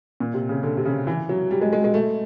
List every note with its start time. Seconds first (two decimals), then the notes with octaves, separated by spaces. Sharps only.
0.20 A#2
0.34 C3
0.49 C#3
0.63 D3
0.77 C3
0.85 C#3
1.07 E3
1.29 F#3
1.51 G3
1.61 G#3
1.73 G#3
1.84 G#3
1.94 A3